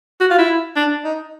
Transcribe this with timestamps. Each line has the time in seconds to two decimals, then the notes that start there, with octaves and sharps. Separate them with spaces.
0.21 F#4
0.31 F4
0.39 E4
0.76 D4
1.05 D#4